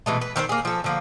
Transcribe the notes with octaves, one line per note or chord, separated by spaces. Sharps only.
B2 E3 G#3 A3
B4
D#3 C4 D4 C5
A#3 G#4
F3 A4
D3 F3 A#3